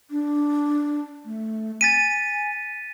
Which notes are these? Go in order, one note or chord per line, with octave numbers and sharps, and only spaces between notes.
D4
A3
G#5 A6 B6 D#7